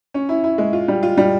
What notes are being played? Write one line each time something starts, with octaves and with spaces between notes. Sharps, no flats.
C#4
E4
E4
G#3
F4
G3
F4
G3